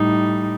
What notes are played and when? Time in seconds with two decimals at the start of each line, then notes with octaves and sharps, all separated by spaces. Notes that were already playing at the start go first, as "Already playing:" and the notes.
Already playing: A2 G3 D#4